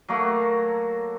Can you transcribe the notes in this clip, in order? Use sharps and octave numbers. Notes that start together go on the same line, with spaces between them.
F#3 A3 A#3 F#4